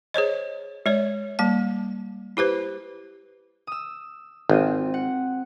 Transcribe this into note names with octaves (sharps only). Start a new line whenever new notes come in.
G#4 C5 C#5 D#5
G#3 C#5 D5
G3 A#3 A5
E4 G4 B4 C5
D#6 E6
G#1 C4 F4 D#7
F#5